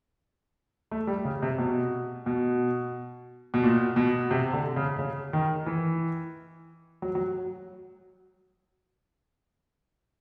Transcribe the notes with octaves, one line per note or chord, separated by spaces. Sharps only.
A3
G3
C#3
C3
B2
B2
B2
A#2
B2
C3
D3
C#3
C#3
D#3
E3
F#3
F#3